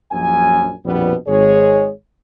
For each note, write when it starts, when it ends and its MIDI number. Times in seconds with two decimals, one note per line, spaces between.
0.12 0.71 34
0.12 0.71 42
0.12 0.71 80
0.86 1.15 34
0.86 1.15 41
0.86 1.15 47
0.86 1.15 55
0.86 1.15 59
1.27 1.90 32
1.27 1.90 56
1.27 1.90 68
1.27 1.90 73